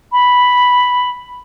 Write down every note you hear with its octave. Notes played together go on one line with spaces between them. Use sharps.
B5